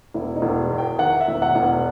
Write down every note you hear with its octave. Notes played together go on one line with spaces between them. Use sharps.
E1 E4
D#4
E1
E2
G5
D#3 F#5
E5
E1
F#5
E1
F#5